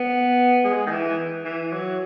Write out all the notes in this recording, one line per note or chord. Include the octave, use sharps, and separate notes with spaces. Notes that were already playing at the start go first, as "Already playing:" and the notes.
Already playing: B3
G#3
D#3
E3
E3
F#3